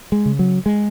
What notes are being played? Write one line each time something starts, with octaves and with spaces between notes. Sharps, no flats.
G#3
C#3
F#3
G#3